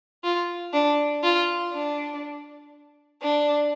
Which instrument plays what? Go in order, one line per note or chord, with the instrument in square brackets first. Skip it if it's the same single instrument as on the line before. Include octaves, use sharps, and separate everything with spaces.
[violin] F4
D4
F4
D4
D4